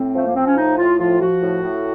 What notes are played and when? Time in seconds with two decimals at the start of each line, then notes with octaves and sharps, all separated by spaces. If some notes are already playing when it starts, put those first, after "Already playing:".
Already playing: A2 C4
0.15 F3 A3
0.25 A#3
0.35 F3 C4
0.46 C#4
0.57 A2 D#4
0.77 A2 F4
0.98 F3 F4
1.19 F3 F#4
1.41 A2
1.61 A2